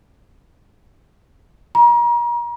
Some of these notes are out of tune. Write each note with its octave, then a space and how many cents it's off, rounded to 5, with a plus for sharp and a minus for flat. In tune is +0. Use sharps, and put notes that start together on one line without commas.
A#5 +35